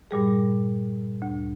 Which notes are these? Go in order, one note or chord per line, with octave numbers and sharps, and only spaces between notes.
G2 A#2 G3 G#4
D2